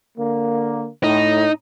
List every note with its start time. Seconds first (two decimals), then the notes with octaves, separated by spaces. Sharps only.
0.18 D3 A#3
1.04 A2 D#4